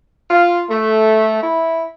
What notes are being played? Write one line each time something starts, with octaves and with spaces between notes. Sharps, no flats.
F4
A3
E4